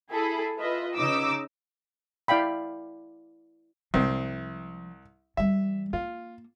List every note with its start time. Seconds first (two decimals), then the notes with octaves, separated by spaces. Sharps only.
0.11 E4 G#4 A4 B5
0.59 F4 B4 D#5 E5
0.95 C#3 D#4 D6 E6
2.28 E4 D5 F5 G5 B5
3.94 C2 F3 G#3 C4
5.37 E3 G3 E5
5.93 A#3 F4